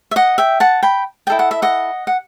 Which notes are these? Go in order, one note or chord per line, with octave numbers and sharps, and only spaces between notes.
E5
D#5 F#5
E5 G5
F#5 A5
G5 B5
E4 A4 D#5 G5
F#5
E5
D#5 F#5
F#5